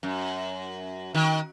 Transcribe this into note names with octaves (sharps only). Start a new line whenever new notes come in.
F#2
D#3